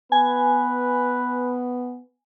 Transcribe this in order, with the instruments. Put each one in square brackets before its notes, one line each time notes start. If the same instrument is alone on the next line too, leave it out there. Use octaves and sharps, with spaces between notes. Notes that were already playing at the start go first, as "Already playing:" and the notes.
[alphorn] B3 [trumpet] B4 [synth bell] G#5